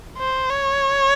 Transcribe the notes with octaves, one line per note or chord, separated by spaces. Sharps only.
C5
C#5